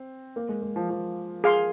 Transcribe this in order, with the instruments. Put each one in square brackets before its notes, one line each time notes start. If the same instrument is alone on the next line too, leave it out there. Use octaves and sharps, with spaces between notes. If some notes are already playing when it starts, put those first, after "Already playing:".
Already playing: [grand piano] C4
A#3
G#3
G#3
F3
F3
[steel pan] G#4 F5 C6